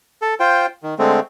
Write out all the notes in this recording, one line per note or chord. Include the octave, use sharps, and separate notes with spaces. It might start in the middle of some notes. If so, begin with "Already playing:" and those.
A4
F4 C5 G5
D#3
D3 G#3 A3 C4